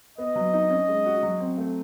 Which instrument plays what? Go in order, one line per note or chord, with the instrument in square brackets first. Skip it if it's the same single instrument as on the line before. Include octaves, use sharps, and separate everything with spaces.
[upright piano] B3 [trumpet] D#5
[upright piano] F#3
D#4
C#4
G#3
F#4
F#3
C4
A3